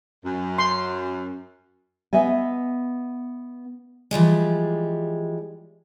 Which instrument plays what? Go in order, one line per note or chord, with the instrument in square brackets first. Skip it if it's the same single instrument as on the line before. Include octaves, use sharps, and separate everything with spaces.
[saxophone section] F#2
[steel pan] C6
[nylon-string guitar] B3 D#5 E5 G#5
[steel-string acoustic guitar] E3 F3 G3 G#3